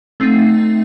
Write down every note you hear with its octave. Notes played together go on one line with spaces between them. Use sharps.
A3 C4 D#4